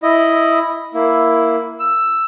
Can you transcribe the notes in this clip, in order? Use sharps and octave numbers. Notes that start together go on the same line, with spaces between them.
E4 D#5
A#3 E4
E6